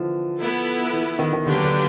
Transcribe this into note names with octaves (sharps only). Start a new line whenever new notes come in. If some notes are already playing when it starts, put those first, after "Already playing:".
Already playing: D3 E3 F3
B3 E4 A4
E3
D#3
D#3
D3 F#3 A#3 D4 G4 B4
D3